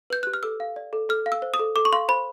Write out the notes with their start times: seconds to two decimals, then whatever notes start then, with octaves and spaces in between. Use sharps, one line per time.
0.10 B4 G6
0.23 G4 F#6
0.34 F6
0.43 A4 E6
0.60 F5
0.76 D5
0.93 A4
1.09 A4 F6
1.26 F5
1.32 E6
1.42 C5
1.54 D#6
1.59 A4
1.76 A4 D6
1.85 C#6
1.93 F5 C6
2.09 C5 B5